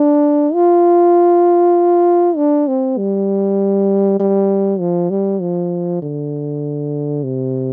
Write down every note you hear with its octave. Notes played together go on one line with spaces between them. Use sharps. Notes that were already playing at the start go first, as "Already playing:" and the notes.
Already playing: D4
F4
D4
C4
G3
G3
F3
G3
F3
D3
C3